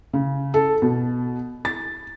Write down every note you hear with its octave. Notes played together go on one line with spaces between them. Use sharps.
C#3
A4
B2
A6